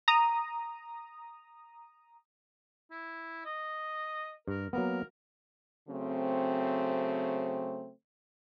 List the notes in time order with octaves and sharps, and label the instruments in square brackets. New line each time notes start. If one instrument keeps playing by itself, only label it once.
[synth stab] A#5 D#6
[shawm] E4
D#5
[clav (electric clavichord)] G2 [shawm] A#4
[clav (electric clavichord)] F#3 A#3 B3 [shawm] A#4
[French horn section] C#3 F#3 A3 C4